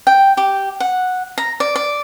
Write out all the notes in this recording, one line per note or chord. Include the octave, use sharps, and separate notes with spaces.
G5
G4
F#5
A#5
D5
D5